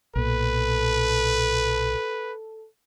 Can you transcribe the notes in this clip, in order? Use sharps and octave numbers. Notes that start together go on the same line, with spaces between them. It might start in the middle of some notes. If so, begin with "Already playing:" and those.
B1 A#2 A4 B4